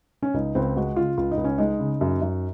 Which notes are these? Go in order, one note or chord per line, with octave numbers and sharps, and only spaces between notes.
C#4
C#2 D#4
C#2 C4
G#3 F#4
C#3 F4
C#2 F4
D#4
C#2
C#4
G#3 D#4
C#3
F#2
F#2